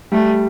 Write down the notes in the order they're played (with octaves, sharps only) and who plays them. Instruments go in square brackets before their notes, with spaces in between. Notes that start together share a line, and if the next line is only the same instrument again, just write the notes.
[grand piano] G3 [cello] A3